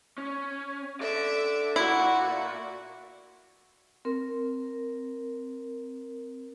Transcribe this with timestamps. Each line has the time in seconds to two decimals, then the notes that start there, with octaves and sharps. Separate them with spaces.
0.18 C#4
1.01 A4 D5 E5 D6
1.76 A#2 E4 F#4
4.05 C4 A#4